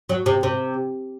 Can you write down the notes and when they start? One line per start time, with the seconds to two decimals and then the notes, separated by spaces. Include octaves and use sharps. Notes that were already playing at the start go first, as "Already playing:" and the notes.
0.09 F#3
0.26 C3
0.43 C3